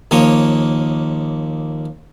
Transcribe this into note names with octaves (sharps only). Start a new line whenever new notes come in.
D#2 F3 A#3 C#5 D#5